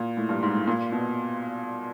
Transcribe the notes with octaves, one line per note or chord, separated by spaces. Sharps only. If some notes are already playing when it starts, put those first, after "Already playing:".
Already playing: A#2
A2
G2
G#2
A2
A#2
B2